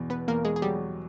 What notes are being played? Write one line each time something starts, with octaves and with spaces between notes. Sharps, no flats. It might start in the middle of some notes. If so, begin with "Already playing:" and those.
Already playing: E2 B2
B3 B4
E2 A#3 A#4
G#3 G#4
G#4
F#3 G3 G4